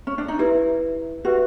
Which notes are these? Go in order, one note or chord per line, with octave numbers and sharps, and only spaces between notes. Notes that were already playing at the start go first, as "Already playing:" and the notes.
C#4
D4
D#4
E4 G4 B4 E5
F#4 G4 B4 E5